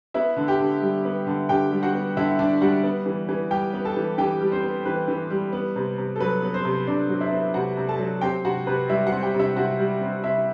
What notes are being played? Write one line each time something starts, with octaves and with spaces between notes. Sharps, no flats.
B3 E4 E5
D3
G4 G5
D3
G3
B3
D3
D3 G4 G5
G3
F#4 F#5
B3
D3 E4 E5
D3 D4 D5
G3 F#4 F#5
B3
E3
E3
G3 G4 G5
B3
A4 A5
E3
E3 G4 G5
G3
C4 C5
B3
E3 B4
E3
G3
B3
C3
C3
A4
F#3 B4
B3
C4 C5
C3
C3 D4 D5
F#3
E4 E5
B3
C3 F#4 F#5
C3
A4 A5
F#3
C4 G4 G5
C3 F#4 F#5
C3 B4
G3 E4 E5
F#4 F#5
C4
G4 G5
C3
E4 E5
C3 F#4 F#5
G3
C4
C3 E4 E5